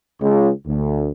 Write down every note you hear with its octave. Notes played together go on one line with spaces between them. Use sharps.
C#2
D2